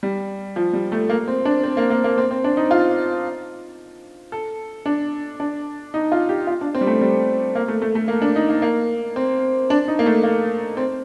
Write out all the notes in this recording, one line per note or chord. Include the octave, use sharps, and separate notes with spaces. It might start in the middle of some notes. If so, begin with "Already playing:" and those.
G3
F3
G3
A3
A#3
C4
D4
C4
A#3
A#3
A#3
C4
C4
D4
D#4
F4
A4
D4
D4
D#4
F4
G4
F4
D4
C4
G3
A3
G3
A#3
A3
A3
A3
A#3
D4
D#4
A#3
A#3
C4
D4
D#4
A#3
A3
A#3
C4